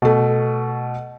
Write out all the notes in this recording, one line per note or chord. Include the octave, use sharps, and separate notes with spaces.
B2 A3